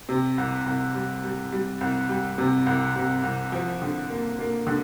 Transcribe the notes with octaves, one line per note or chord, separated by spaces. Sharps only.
C3
C2
C2
G3
G3
G3
C2
G3
C3
C2
C3
C2
F3
D3
A#3
A#3
D3